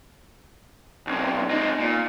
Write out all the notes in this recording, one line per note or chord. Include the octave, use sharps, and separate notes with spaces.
B1 C3
C4 D#4
A#2